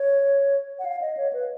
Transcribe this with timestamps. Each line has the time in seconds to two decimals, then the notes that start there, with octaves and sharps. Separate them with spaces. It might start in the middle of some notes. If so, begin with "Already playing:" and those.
Already playing: C#5
0.79 F#5
0.85 F5
1.01 D#5
1.17 C#5
1.33 B4